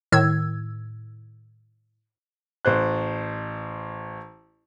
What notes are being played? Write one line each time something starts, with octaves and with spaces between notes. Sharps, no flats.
A2 D#3 E6 G#6
A1 C5 F#6